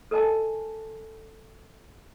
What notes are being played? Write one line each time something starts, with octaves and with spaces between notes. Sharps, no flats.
A4 A#4 D#5 G#5 A5